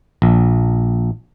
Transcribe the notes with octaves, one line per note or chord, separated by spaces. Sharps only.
A#1